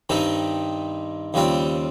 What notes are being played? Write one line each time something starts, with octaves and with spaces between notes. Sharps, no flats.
G2 D#3 G3 C4 D#4
D#2 C#3 G3 C4 F4